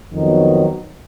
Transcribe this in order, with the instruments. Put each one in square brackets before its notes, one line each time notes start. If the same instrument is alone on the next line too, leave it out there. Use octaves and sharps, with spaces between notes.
[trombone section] F2 D#3 F#3 B3 D#4